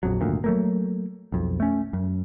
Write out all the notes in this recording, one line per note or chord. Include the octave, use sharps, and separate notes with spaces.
A#1 F2 F#3
G#1 D2 A#2
F#3 A3 A#3
B1 F2
A3 C#4
F#2